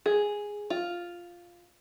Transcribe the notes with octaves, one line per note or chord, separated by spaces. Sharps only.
G#4
F4